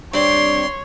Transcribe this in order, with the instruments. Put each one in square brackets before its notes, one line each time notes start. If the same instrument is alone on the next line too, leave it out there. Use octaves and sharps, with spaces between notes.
[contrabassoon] G2 [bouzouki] C4 D5 [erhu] C#5 [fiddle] C6